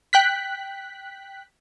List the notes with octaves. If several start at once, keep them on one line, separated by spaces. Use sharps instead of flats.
G5 F#6 B6